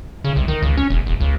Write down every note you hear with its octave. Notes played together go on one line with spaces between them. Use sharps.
C#3
C2
D#3
C#2
C#4
E1
E1
C#2